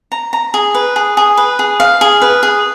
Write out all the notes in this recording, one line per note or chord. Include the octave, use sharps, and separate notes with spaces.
A#5
A#5
G#4
B4
G#4
G#4
B4
G#4
F5
G#4
B4
G#4